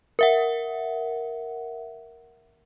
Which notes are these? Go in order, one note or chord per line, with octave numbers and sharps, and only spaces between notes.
A#4 E5 F#5